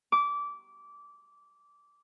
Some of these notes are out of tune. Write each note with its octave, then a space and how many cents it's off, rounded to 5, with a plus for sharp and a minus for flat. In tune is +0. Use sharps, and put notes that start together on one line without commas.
D6 -20